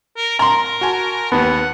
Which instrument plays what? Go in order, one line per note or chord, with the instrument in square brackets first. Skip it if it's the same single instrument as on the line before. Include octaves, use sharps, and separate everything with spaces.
[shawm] A#4
[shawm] A#4 [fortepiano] A#5 C6
[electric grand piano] F#4 G#5 A5
[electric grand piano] D#2 A5 [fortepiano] B3 [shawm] F#5